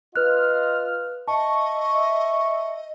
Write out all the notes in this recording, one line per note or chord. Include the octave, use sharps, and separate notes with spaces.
F4 B4 D#5 F6 F#6
D#5 E5 A5 C#6